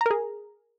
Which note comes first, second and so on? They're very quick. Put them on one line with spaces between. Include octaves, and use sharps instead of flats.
A#5 A#4 G#4